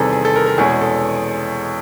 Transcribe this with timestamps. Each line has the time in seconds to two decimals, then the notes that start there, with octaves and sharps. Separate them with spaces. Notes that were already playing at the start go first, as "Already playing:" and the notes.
Already playing: E2 C3 D#3 G3 C4 G#4 A4 B4
0.12 G#4
0.25 A4
0.36 A#4
0.46 A#4
0.58 E2 B2 G#3 C#4 G#4
0.69 G#4
0.81 A4